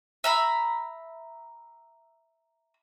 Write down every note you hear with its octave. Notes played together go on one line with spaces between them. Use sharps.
E5 A#5 B5